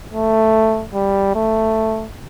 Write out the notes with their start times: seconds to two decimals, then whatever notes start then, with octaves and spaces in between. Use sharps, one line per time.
0.12 A3
0.94 G3
1.35 A3